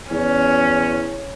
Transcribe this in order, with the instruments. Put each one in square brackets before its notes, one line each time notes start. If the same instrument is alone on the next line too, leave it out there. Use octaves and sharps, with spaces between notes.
[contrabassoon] E2 [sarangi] C#4